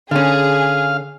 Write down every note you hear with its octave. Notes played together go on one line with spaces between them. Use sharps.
D3 C#4 G#4 F5